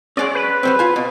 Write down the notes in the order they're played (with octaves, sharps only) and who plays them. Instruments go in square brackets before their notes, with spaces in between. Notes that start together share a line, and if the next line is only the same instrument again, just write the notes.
[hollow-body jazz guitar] F#3 G#3 C#4 [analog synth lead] D5
[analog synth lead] B4
[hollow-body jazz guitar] F#3 G3 C4
F4 G#5
B2